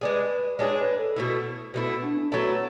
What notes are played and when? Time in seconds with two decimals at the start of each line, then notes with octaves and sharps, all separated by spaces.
0.01 G#3 D4 G#4 B4
0.59 G#3 D4 G#4 C#5
0.78 B4
0.97 A4
1.16 B2 A3 E4
1.74 B2 A3 B3 E4
1.88 B3
2.02 D4
2.17 C#4
2.31 F#3 A3 B3 E4 A4